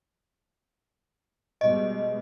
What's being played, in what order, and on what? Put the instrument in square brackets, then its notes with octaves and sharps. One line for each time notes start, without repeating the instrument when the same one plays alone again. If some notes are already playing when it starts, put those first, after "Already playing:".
[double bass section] B2 G3 G#3 [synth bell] D#5